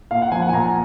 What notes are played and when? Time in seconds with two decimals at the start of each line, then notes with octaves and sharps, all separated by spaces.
0.11 A#2 F5
0.22 F#5
0.31 F3 G#5
0.42 F#5
0.49 G#5
0.53 A#2 A#5